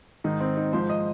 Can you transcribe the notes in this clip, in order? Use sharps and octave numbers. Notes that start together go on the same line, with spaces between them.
G#2 D#3 D#4
C4
D#4
G#2 F3 C5
D#5